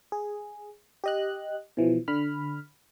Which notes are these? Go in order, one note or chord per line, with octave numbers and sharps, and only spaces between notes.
G#4
G4 D#5 F#6
B2 E3 F3
D3 B5 F6